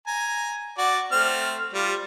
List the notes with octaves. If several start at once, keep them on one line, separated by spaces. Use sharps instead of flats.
G#5 A#5
F#4 D5
A3 C4 F6
G3 F4